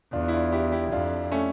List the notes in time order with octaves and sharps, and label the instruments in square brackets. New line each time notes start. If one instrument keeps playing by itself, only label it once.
[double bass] E2 [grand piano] D4 F4
[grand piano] E4
D4 F4
E4 G4
E4 G4
[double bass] F2 [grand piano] D4 F4
[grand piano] A3 C#4